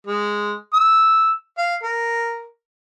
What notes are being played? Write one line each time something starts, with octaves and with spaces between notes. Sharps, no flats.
G#3
E6
F5
A#4